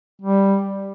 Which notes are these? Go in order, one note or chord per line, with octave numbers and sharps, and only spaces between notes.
G3